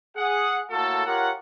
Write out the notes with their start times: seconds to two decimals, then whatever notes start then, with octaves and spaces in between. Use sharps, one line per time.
0.17 G#4 F#5
0.70 A2 A#3 F#4 A4
1.06 F4 G4 A#4 C#5 F#5